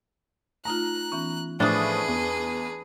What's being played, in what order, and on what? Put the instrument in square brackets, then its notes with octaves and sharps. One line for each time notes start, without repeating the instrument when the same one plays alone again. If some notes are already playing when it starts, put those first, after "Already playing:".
[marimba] A3 D#4 F4 [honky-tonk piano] A#5 [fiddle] F#6
[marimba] E3 B3 C#4
[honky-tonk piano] A2 F3 D#6 [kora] D4 [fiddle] G#4 B4
[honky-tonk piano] E2